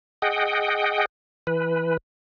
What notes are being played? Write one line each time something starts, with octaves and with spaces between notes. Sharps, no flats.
G#4 D#5 F#5 G5
E3 B4